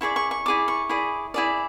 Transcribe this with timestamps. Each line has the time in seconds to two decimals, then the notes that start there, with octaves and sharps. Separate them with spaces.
0.01 E4 G#4 D5 C#6
0.16 C#6
0.31 C#6
0.46 E4 G#4 D5 D6
0.68 C#6
0.89 E4 G#4 D5
1.34 E4 G#4 D5